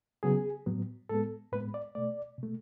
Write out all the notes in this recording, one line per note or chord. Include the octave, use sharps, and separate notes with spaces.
C#3 F#3 B3 G#4
A2 F#3 B3
A2 G#3 B3 A4
A2 G#3 B3 B4
D5
B2 A3 D5
B2
A3